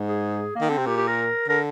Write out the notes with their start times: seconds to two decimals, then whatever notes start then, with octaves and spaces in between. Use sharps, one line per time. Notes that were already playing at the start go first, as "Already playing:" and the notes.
Already playing: G#2
0.09 G#4
0.56 A#3
0.61 D#3
0.69 D3 C4
0.78 C3
0.86 A#2 G4
0.97 G4
1.07 A#4
1.48 D3 A#4